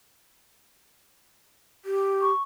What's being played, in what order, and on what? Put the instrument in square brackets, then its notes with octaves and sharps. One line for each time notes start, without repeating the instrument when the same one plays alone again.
[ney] G4
[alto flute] C#6